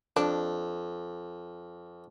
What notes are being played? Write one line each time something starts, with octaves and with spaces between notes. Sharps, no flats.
F2 D4